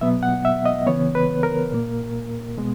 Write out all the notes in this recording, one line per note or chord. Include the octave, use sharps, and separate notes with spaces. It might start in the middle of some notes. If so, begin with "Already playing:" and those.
B2 F#3 B3 E5
F#5
E5
D#5
C#3 E3 B3 C#5
B4
A#4
A#2 A#3
B2 G#3 B3